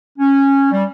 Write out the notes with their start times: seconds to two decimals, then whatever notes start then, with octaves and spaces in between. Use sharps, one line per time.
0.19 C#4
0.72 G3